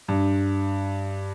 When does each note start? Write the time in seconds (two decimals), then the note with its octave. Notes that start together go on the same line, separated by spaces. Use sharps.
0.08 G2